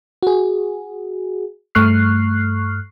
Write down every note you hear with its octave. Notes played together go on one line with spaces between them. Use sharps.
F#4 G#4
G2 A3 C#6 F6 F#6 C7